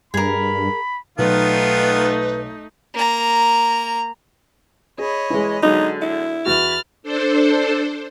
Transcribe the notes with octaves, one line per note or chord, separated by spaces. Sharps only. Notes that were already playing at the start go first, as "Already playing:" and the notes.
G2 G#4 A#4 B5
B1 D#3 A3 B3 D#4 F4 B4
A#3 A#5
G#4 C#5 D#5 B5
E3 G#3
D3 F#3 G#3 D#4
E4
E2 F#4 B5 F6 A6
D4 A4 C5